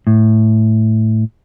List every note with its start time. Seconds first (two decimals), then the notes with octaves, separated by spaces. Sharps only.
0.07 A2